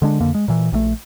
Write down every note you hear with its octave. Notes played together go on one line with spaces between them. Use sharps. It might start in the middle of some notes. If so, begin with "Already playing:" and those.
D3 G#3 D4
F2 D3 A#3
G#3
A#2 E3
A#1 C#3 A3